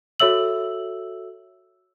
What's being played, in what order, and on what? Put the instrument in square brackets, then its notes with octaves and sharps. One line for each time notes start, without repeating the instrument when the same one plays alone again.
[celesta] F#4 A4 C#5 E5 E6 F#7